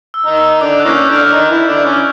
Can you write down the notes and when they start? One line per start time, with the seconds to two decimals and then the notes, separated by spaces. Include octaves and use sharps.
0.14 E6
0.26 D#3 D#4
0.37 E6
0.61 D3 D4 D6
0.80 F#6
0.85 E3 A#3 C#4
0.97 G6
1.08 D3 D4
1.15 F6
1.23 D4
1.33 D#3 D#4
1.50 E3 E4
1.68 D3 D4
1.85 C#4